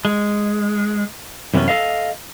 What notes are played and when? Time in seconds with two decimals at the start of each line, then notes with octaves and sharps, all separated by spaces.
0.05 G#3
1.54 F#2 C3 E3 B3 C#4
1.68 A4 D#5 F5